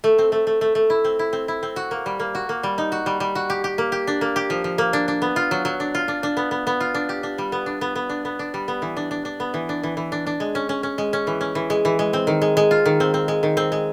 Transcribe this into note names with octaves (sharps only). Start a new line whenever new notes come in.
A3
C4
A3
A3
A3
A3
E4
C4
E4
C4
E4
C4
F#4
A#3
G3
A#3
F#4
A#3
G3
D#4
F#4
G3
G3
F#4
G4
G4
A#3
G4
D4
A#3
G4
F3
F3
A#3
D4
D4
B3
F4
F#3
F#3
D4
F4
D4
D4
B3
B3
B3
F4
D4
G4
D4
G3
B3
D4
B3
B3
D4
B3
D4
G3
B3
E3
D4
D4
D4
B3
E3
D4
E3
E3
D4
D4
G#3
C#4
C#4
C#4
G#3
C#4
E3
C#4
E3
G#3
E3
G#3
C4
D#3
G#3
G#3
F4
D#3
C4
C4
G#3
D#3
C4
G#3